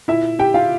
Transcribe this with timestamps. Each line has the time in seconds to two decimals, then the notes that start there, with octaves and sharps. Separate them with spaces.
0.08 A#2 E4 E5
0.39 G4 G5
0.54 F4 F5